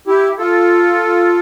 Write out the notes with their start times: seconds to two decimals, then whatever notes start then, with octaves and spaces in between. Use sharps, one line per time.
0.07 E4 G4
0.38 F4 A4